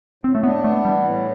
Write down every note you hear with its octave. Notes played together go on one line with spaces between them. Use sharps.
A2 C4
A3
B3 D4
A3 B3
E3 G3
A2